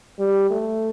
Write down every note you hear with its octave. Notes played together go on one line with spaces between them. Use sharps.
G3
A3